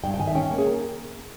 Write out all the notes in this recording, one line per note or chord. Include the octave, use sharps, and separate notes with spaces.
G2 G5
G5
D#3 G#5
E5
C#4 G5
A#3
G#4
A#4